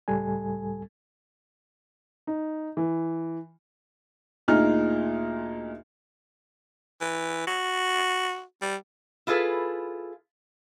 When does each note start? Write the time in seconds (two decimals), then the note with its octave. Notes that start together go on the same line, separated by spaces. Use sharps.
0.08 C#2 A2 G3 A4 G#5
2.27 D#4
2.77 E3
4.48 D2 A#2 D#4 F4 G#4 F6
7.01 E3
7.47 F#4
8.62 G3
9.27 E4 F4 G#4 A4 B4